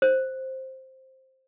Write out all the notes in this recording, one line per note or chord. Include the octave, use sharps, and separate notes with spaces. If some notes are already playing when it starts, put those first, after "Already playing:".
C5